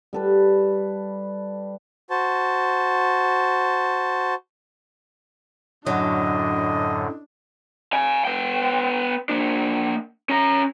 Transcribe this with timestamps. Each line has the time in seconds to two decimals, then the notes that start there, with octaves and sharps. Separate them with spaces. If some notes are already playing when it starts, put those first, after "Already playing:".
0.13 G3 A4 B4
2.10 F#4 C5 A5
5.86 F#2 A2 D3 F#3 D4 D#5
7.93 F5 G#5
8.25 B3 G5
9.29 A#3 D4
10.29 C#4 A#5